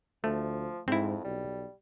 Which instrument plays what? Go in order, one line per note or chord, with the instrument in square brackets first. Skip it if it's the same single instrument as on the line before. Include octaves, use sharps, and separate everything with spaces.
[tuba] D2 [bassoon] F3 [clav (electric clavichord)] A3
[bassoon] F2 [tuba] G#2 [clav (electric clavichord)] C4 E4
[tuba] B1 [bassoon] G3